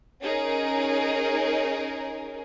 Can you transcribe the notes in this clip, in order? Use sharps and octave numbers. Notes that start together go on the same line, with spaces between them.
C#4 D#4 G#4 A#4